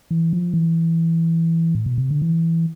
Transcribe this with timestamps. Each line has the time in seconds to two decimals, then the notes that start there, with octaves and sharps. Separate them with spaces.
0.11 E3
0.33 F3
0.54 E3
1.75 A2
1.86 B2
1.98 C3
2.11 D3
2.22 E3